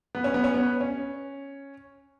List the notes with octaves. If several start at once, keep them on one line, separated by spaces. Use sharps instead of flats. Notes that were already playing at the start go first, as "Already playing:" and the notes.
B3
C#4
B3
C#4
B3
C#4